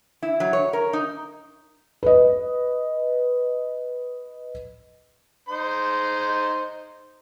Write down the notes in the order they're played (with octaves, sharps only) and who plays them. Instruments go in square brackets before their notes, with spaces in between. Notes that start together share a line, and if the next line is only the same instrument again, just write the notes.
[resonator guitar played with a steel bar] E4
F#3
C#5
A#4
D#4
[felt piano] B4 D#5
[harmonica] D#4 C5 C6